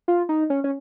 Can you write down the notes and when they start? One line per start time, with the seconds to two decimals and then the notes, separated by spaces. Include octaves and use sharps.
0.08 F4
0.29 D#4
0.50 C#4
0.64 C#4